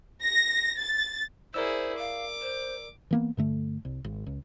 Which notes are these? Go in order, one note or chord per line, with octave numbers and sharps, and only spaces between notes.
A#6
A6
E4 G#4 A#4 C5 D5 E6
F5 D6
C5
E3 A#3 B3
G2 D3 A3
C2
G#1
C#2